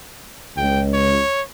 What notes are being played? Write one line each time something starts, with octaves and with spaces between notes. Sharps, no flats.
C#2 G5
C#5